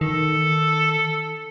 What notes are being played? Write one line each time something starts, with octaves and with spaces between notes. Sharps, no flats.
D#3 A4